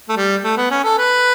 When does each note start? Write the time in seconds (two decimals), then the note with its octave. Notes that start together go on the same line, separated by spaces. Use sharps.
0.09 A3
0.17 G3
0.44 A3
0.57 B3
0.71 C#4
0.84 A4
0.98 B4